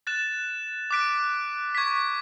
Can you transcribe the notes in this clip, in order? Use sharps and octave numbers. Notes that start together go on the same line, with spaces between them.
F#6 A6 E7
D6 F#6 B6 D7
C#6 G#6 B6